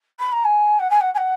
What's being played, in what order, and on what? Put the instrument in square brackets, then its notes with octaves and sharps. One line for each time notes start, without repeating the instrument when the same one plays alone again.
[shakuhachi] B5
A#5
G#5
F#5
G#5
F#5
G#5
F#5